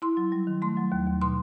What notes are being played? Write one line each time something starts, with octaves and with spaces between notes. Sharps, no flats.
E4 C6
F#3
G3
D#3
A3 C6
F#3
D#2
D#2
B2 C6